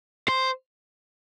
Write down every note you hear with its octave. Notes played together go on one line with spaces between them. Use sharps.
C5